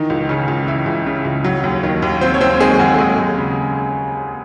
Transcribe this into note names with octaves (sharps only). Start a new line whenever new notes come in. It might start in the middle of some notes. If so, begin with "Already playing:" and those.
Already playing: D#3 E3 D#4
C#2
C#3 C#4
C#2
E3 E4
C#2
C#3
C#2
F#3
D#2
D#3
D#2
F#3 C4 C5
C#5
D#2 C4 C5
D#3 G#3 G#4
D#2 F#3 F#4
A4
F#3 G#3 G#4
D#2
C#3